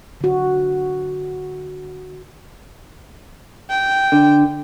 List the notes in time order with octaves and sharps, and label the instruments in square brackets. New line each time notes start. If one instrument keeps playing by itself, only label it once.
[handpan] D3 F#4
[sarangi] G5
[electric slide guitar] D3